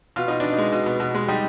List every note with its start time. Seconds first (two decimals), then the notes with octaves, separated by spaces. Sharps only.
0.16 B2 F4
0.28 B2 D#4
0.40 B2 D4
0.52 D#4
0.58 G#3
0.72 B2
0.86 B2
1.00 B2
1.15 G#3
1.28 G3 D#4 G4